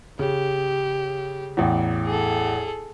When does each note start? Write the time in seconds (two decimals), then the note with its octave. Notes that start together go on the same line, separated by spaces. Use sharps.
0.19 C#3 G4
1.57 A1 E2
2.05 G#4 A4